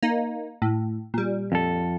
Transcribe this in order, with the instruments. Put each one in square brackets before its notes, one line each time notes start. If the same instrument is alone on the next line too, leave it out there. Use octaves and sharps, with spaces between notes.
[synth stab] A#3 D#4
A2
A#2 G3
[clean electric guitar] F2 A4